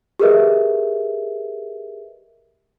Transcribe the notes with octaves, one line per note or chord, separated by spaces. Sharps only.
G4 G#4 A#4 B4 D#5 E5